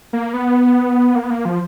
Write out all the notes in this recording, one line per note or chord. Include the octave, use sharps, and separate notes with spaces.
A#3
B3
A#3
B3
A#3
F3